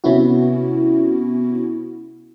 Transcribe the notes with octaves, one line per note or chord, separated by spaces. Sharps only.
C3 B3 C#4 E4 F#4